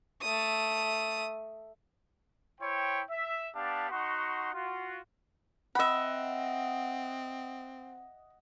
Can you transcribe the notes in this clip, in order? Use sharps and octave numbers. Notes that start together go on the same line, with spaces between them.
A3 D#6
E4 C5 C#5 G5
E5
B3 D4 G4 F5 A5
D#4 F#4 F#5 C6 C#6
F4 F#4
C4 D#5 E5 F#5 B5